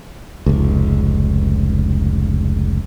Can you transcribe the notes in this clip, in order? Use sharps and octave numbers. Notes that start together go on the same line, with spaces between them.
F1 C#2